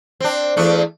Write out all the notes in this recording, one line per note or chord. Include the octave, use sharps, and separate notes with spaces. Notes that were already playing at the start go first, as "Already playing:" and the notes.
C4 D4
E2 A3 D4